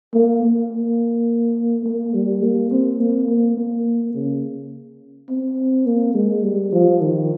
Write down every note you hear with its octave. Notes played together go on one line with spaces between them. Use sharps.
A#3
A#3
A#3
G3
A#3
C4
A#3
A#3
A#3
C#3
C4
A#3
G#3
G3
F3
D#3